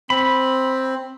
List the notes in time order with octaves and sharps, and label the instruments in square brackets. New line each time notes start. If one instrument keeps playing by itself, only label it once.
[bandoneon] C4 [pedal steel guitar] B5